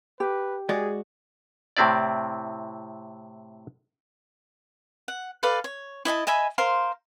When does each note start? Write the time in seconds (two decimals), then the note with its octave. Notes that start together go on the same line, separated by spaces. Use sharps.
0.20 G4 B4
0.69 G#3 F#4 G#4 D5
1.77 A2 C3 C4 E4 D5
5.08 F#5
5.43 A4 B4 D5 F5
5.64 C#5
6.05 E4 D#5 G#5 A5
6.27 D#5 E5 G#5 B5
6.58 A#4 C5 F5 C6